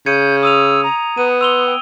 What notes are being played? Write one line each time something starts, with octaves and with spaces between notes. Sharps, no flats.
C#3 G6 G#6 C#7 D#7
D#6 E6 D#7 F7
A#5
B3 D#7
C6 E6 F7 G7
G5